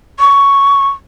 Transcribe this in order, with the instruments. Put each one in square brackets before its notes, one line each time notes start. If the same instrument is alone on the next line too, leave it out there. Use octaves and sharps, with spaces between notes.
[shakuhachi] C#6